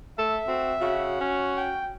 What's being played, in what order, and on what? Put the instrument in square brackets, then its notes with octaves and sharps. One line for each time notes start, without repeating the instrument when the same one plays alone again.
[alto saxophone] A3 [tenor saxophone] A4 [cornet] E5
[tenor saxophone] C4 [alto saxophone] F#4
[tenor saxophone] C#3 [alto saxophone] F#4
[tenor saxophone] C#4
[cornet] G5